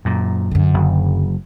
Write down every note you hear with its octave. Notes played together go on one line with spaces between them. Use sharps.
F#2 A#2
F#2 D3
F#1